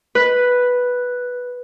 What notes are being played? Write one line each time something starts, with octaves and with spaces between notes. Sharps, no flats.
B4